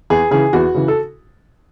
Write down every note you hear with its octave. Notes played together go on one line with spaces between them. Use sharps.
E2 G#4
C#3 E3 G#4
E2 F#4
C#3 E3
A4